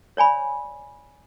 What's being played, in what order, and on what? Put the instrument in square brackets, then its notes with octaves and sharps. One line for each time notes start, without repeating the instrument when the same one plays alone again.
[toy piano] C#5 D5 G#5 B5